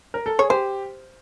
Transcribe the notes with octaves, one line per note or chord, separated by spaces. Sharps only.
A#4
A4
G#4 C#5
G4 C5